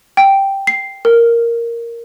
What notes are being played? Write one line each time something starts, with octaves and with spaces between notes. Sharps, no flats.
G5
C7
A#4